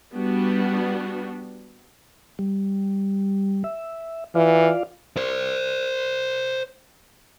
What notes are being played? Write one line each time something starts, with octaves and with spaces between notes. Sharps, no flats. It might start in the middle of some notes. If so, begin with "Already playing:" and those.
G3 B3 D4 F#4
G3
E5
E3 F4 D5 F5
C5 D5